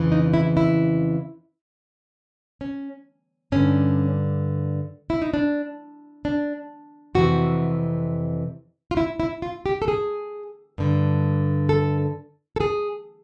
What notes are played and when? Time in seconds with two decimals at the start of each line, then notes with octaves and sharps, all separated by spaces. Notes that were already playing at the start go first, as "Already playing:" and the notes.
Already playing: F2 C#3 E3
0.12 D#4
0.34 E4
0.57 E4
2.61 C#4
3.52 G2 D3 C#4
5.10 E4
5.22 D#4
5.34 D4
6.25 D4
7.15 F2 C3 E3 F#4
8.91 F4
8.97 E4
9.20 E4
9.42 F4
9.66 G4
9.82 A4
9.88 G#4
10.78 G2 D3
11.69 A4
12.56 A4
12.60 G#4